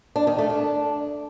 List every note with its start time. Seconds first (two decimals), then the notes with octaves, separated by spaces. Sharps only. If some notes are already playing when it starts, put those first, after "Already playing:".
0.16 D4
0.27 D#3
0.38 A3
0.50 D4